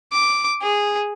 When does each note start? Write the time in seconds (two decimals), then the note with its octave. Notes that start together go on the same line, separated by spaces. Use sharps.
0.12 D6
0.62 G#4